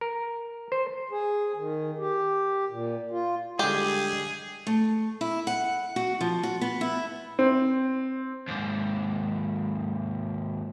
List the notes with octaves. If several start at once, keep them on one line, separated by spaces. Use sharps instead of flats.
A#4
C5
G#4
D#3
G4
A#2
F4
D3 G3 G#3 G4 G#4
A3
E4
F#5
F#4
F3
F#4
B3
E4
C4
D#2 G#2